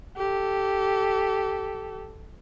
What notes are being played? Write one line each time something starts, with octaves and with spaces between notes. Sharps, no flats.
G4 A4